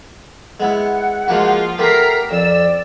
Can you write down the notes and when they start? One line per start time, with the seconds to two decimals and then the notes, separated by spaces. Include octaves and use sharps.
0.60 G#3 B3 E4 F#5
1.28 F3 G#3 A#3 F4 F#4
1.79 A3 B3 G4 A#4 A#5 B6 C7
2.31 F2 D5 E6